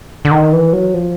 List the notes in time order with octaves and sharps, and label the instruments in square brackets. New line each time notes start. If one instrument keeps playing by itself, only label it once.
[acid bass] D3
D#3
E3
F#3
F3